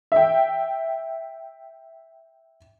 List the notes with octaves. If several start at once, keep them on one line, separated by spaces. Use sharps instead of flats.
E5 G5